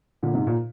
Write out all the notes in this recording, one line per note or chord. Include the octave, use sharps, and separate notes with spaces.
A#2 D3
G#2 C3
A#2